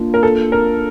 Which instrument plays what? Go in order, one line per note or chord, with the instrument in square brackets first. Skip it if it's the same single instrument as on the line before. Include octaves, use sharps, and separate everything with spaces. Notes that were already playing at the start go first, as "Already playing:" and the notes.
Already playing: [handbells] A#3 D4 F4
[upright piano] A#4
A4
A#4